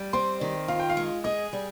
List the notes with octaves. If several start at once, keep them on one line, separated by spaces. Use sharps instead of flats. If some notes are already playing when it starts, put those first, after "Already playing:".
Already playing: G3
C4 C6
D#3
F4 F5
G5
F5
G#3
G#4 D#5
G3